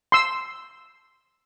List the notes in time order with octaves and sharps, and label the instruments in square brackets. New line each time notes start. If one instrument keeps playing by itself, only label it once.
[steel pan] C6 E6